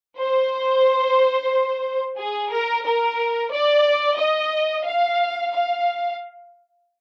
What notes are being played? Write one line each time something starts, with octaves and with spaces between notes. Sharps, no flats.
C5
G#4
A#4
A#4
D5
D#5
F5
F5